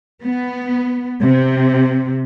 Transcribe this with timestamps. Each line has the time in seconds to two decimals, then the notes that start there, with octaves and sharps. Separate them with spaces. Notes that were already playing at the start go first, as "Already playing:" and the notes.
0.24 B3
1.22 C3